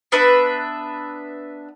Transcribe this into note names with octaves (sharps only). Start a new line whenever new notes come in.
B3 D4 B4 E5